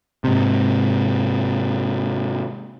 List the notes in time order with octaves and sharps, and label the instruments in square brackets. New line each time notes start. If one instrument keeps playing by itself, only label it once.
[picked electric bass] G#2 C3